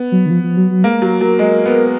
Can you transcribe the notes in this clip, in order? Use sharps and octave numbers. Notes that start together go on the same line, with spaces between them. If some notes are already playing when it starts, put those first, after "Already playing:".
Already playing: B3
F#3
D#3
F3
F3
F#3
F#3
G#3 A#3
F#3
F#3 A#4
G#3
B3